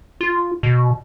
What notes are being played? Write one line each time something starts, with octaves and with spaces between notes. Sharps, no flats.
F4
B2